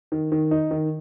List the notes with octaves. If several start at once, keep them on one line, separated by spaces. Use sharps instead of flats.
D#3
D#3
D#4
D#3